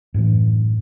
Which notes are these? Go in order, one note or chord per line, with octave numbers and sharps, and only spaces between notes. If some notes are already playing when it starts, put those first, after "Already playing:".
F#2 A2 E3